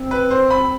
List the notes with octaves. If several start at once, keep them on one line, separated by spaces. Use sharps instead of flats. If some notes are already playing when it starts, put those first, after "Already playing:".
Already playing: C4
B4
C5
B5